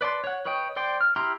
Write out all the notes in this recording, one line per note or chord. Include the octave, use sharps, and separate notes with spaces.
B4 D5 A5 C6
C#5 F#5
B4 C#5 D#5 G5
C5 D5 G5 C6
F6
E4 G4 A#5 C6 F6